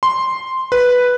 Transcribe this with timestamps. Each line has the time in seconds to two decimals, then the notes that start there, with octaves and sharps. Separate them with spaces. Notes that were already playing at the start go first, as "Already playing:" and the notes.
0.03 C6
0.72 B4